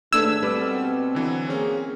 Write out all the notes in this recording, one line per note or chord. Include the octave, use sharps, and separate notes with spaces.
D#2 G#2 A3 D4 A4 B4 E6 G#6
B2 G3 B3 C4 B4 D6
D3 E3 F#3
A#3 C4 C#4 G#4